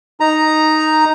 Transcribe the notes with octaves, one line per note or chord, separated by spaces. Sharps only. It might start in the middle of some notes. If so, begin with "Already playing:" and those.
D#4 A#5